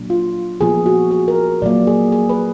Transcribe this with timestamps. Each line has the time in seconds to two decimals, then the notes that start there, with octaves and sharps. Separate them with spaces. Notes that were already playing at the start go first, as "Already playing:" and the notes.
Already playing: A#2 F#3 D4
0.10 F4
0.61 A#2 F3 B3 G#4
0.86 F#4
1.11 G#4
1.28 A#4
1.62 A#2 F#3 A#3 D5
1.87 G#4
2.12 G#4
2.29 B4